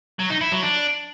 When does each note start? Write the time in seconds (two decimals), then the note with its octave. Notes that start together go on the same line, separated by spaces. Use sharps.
0.20 F#3
0.30 D#4
0.41 E4
0.52 F#3
0.63 D4